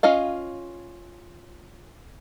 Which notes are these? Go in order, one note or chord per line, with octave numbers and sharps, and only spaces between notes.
C#4 F4 D#5 F5